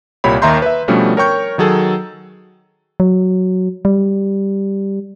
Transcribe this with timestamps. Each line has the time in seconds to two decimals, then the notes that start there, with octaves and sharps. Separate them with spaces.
0.24 C2 A#2 G4 C#5 B5
0.42 D#2 D#3 E5 A#5 C6 G6
0.62 B4 E5
0.88 B2 F3 G3 A3 C#4 D4
1.17 A#4 C#5 G5 C#6 G6
1.58 D#3 F#3 G#4 A4
3.00 F#3
3.85 G3